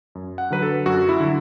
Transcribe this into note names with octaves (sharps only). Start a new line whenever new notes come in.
F#2
F#5
D3 F#3 B4
A4
F#2 F#4
E4
D3 F#3